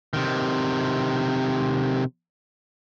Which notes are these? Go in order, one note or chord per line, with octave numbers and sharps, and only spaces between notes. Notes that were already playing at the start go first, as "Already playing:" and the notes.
C3 D#3